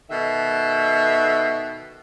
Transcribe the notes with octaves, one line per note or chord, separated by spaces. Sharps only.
B2 D#3 A4 E5